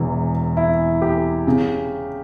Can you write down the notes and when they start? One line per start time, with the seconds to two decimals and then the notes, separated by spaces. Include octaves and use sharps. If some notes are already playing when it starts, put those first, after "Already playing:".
Already playing: E1 E2 E3
0.57 E4
1.02 G4
1.47 C#3